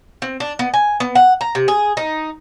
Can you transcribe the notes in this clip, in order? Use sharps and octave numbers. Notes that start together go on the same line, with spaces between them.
C4
D4
B3
G#5
B3
F#5
A#5
C3
G#4
D#4